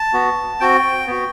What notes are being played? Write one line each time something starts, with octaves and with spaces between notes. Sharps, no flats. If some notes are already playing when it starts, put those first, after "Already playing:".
Already playing: A5
B3 F#4
C4 F#4 G5
B3 F#4